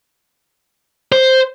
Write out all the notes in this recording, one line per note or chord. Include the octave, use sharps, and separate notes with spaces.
C5